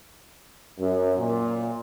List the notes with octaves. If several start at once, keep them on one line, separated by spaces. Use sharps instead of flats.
F#2
A#2